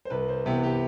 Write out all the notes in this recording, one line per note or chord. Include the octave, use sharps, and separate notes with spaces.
C5
C2 B4
C5
C3 E3 B3 B4
G4